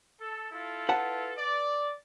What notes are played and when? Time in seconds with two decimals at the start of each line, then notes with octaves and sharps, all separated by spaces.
0.20 A4
0.52 E4 F4 A4
0.89 B4 F#5 A5
1.37 D5